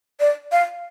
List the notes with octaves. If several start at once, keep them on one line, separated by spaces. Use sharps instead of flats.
D5
F5